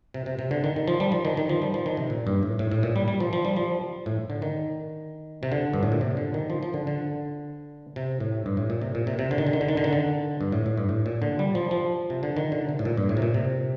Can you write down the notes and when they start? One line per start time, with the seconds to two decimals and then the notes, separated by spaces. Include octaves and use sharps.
0.14 C3
0.26 C3
0.39 C3
0.51 D3
0.64 D#3
0.76 D#3
0.88 F3
1.00 G3
1.12 F3
1.25 D#3
1.37 D#3
1.49 F3
1.62 G3
1.74 F3
1.86 D#3
1.97 C3
2.10 A#2
2.27 G2
2.43 A2
2.59 A2
2.72 A2
2.83 A#2
2.96 G3
3.08 G3
3.20 F3
3.33 F3
3.45 G3
3.56 F3
4.06 A2
4.30 D3
4.42 D#3
5.43 C3
5.52 D3
5.74 G2
5.83 A2
5.92 A#2
6.01 C3
6.17 D3
6.34 D#3
6.50 F3
6.63 F3
6.74 D3
6.87 D3
7.96 C3
8.20 A2
8.46 G2
8.57 A2
8.70 A#2
8.82 C3
8.95 A#2
9.07 C3
9.19 C3
9.31 D3
9.38 D#3
9.47 D3
9.53 D#3
9.61 D3
9.68 D#3
9.77 D3
9.84 D#3
9.93 D3
10.41 G2
10.52 A2
10.66 A2
10.78 G2
10.89 A2
11.06 A#2
11.22 D3
11.39 G3
11.55 F3
11.71 F3
12.10 C3
12.23 D3
12.37 D#3
12.52 D3
12.69 C3
12.79 A2
12.85 A#2
12.97 G2
13.09 A2
13.17 C3
13.22 A#2
13.34 C3